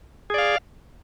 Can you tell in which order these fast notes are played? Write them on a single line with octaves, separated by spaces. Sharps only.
G#4 D5 F5